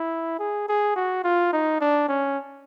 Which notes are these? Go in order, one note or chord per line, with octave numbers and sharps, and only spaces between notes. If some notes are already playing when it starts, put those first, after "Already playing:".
Already playing: E4
G#4
G#4
F#4
F4
D#4
D4
C#4